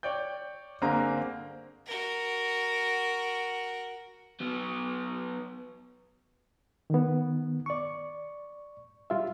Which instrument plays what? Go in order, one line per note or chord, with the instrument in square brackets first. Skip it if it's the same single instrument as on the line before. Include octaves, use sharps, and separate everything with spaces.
[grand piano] C#5 D5 G5 G6
G1 A#3 C4 G#4 A#5
[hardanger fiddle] F#4 A#4
[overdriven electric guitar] F#3 B3
[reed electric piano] D#3 B3
D5 C#6
G3 F4 E5